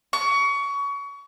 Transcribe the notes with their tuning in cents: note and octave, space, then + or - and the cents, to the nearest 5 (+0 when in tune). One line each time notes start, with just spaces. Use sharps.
C#6 +25